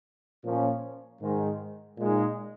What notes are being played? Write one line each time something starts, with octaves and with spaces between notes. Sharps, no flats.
A#2 F3 A#3 C#4
G#2 D#3 G#3
A#2 G#3 D#4